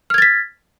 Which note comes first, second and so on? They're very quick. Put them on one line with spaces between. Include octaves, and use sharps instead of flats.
F6 G#6 A6 B6